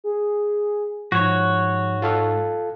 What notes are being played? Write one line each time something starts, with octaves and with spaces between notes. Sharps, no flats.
G#4
G#2 F3 F#4 C#5
F4 A4 F5